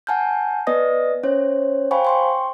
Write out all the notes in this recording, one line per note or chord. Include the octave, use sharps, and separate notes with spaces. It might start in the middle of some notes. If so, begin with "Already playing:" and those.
F#5 G#5 A5 F6 G6
B3 B4 D5 D#5 D#6 A#6
C#4 C5 C#5
C5 F5 G5 G#5 B5 C#6
G5 C6 C#6